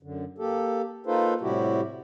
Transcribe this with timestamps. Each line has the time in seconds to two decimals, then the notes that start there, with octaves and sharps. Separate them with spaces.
0.03 F#2 D3
0.38 A#3 G4 A4
1.06 A#3 D#4 F4 A4 B4 C5
1.41 A2 C3 G3 E4 F#4 G4